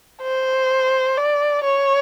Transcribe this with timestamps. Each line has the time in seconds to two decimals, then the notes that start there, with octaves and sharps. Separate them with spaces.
0.22 C5
1.17 D5
1.65 C#5